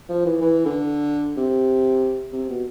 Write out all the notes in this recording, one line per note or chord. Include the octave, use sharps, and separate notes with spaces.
F3
E3
E3
D3
C3
C3
B2